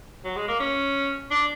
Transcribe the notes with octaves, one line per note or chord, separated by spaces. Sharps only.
F#3
G#3
A#3
C#4
D4